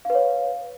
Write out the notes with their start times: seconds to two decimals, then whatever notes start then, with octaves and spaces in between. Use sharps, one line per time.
0.05 F5
0.10 B4
0.15 C#5